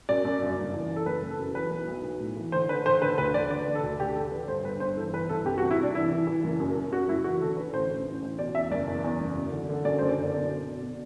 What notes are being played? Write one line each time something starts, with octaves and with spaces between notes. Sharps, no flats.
F#2 D5
F#2
G1
F#1
E3
E3
A4
F#1 B4
F#1
A4
F#2
E3 B4
B1
B1
B1
A2
E3
D3 C5
D3 B4
D3 C5
D3 B4
D2 B4
D3 D5
D3 D5
D3
A4
D2
D2 G4
D3 A4
D3 B4
G2 C5
G1 B4
G1 C5
E3 A4
E3 B4
G1 A4
C2 G4
F#4
C3
E4
C2 D4
E3 E4
E3
E3
F#1
F#2
F#2
F#2 F#4
F#1 E4
E3 F#4
D3 A4
D3 B4
A1 C5
A1
A1
A1
B2 D5
E2 E5
F#1 D5
E2
E2
F#1
F#2
D3
D3
F#2 D5
F#1 C5
D5
D3
B2 D5
B2
B2
B2